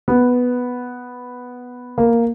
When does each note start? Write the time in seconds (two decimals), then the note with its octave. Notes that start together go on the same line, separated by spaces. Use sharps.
0.08 B3
1.98 A#3